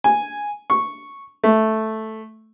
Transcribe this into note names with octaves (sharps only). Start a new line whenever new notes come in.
G#5
C#6
A3